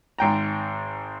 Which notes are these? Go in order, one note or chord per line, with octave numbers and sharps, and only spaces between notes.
G#1 G#2 G5 A#5